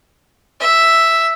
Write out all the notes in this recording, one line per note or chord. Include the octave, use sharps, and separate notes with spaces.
E5